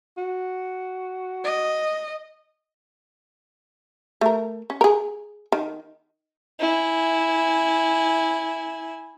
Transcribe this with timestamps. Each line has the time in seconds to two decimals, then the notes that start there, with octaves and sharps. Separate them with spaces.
0.18 F#4
1.44 D#5
4.21 A3 A#4
4.70 C#4
4.81 G#4 A#4
5.52 D#3
6.59 E4 G#5